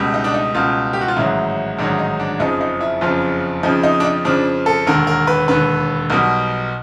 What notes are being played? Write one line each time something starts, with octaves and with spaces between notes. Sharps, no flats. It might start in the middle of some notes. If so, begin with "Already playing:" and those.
Already playing: C#2 B2 G3
D#4
D4
D#4
C#2 B2 G3 F4
G4
F#4
F4
A1 G#2 D#3 F#3 E4
A1 G#2 D#3 F#3 D4
D#4
D4
F#1 F2 C#3 F3 D#4
D#4
E4
F#1 F2 C#3 F3 F4
F2 C#3 F3 D#4
D#4
D4
D#4
F2 C#3 F3 D4
A4
E1 D#2 D3 A#4
A#4
B4
E1 D#2 D3 B4
B1 B2 G3 A#4